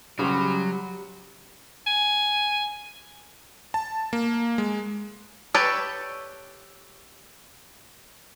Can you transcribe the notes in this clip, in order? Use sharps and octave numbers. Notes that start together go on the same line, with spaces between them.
C#3 F#3 G3 C6
G#5
A5
A#3
G#3
G4 A4 B4 C#5 D5